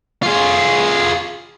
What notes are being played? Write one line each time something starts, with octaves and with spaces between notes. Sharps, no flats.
F4 G#4